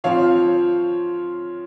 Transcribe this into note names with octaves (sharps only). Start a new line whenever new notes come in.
F3 C4 F4 C#5 F5